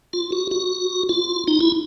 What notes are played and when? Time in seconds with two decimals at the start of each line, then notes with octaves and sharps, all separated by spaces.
0.13 F4
0.32 F#4
0.51 F#4
1.09 F4
1.47 D#4
1.61 E4